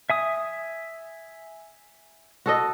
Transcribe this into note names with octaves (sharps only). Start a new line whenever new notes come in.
E5 G#5 D#6
F#4 A4 D#5